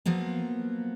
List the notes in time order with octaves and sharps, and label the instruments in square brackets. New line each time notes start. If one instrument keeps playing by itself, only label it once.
[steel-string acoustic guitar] F3 F#3 A#3 B3